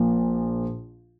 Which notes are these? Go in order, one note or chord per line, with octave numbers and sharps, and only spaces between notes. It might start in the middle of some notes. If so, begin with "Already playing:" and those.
Already playing: A#1 A#2 F3